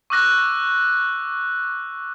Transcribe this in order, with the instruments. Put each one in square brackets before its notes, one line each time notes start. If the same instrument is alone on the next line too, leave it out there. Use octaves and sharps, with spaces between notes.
[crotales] C#6 D6 E6 F#6 A#6